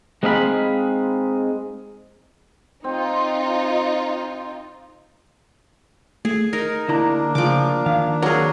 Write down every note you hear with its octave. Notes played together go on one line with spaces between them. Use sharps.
G#3 C4 D#4 G#4 F5 B5
C4 D#4 F4
A3 G#4
D#4 A#4
D2 A#3 D4 E4 A#5
C#3 F3 D6
D#3 F5
F#3 G#4 A#4 C#5 A#5